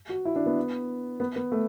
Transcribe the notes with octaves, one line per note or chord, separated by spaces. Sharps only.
F#4
E4
D4
B3
B3
B3
A3